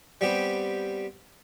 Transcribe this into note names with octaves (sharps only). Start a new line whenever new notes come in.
G3 B3 C4 G4